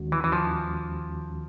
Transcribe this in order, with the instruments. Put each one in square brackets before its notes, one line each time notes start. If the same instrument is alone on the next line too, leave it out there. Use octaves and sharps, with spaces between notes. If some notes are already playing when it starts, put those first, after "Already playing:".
Already playing: [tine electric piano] D#2 D#3 G#3 C#4 F#4
[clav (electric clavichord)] E3
E3
F3